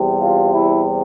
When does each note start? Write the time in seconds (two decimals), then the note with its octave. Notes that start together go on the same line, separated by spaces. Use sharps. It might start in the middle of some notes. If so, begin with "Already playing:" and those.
Already playing: E2 C3 G3
0.21 F4
0.52 E4